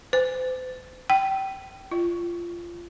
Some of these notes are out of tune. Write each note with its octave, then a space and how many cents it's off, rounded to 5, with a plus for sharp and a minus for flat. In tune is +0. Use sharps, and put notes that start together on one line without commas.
C5 -40
G5 -25
F4 -20